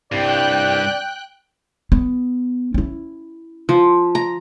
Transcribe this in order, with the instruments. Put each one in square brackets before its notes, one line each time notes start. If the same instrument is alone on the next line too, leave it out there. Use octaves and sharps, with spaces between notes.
[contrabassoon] C2 [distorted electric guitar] G2 [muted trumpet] D5 [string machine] G5 F#6
[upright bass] B3
C#4 E4
[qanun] F3
A#5